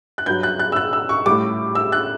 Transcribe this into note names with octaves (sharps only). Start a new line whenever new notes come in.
F#6
G2 F#3 G6
F#6
F#6
E6
F#6
E6
C#6
A2 G3 D6
E6
F#6